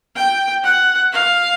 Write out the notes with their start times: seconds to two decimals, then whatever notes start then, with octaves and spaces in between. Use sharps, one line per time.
0.16 G5
0.64 F#5
1.12 F5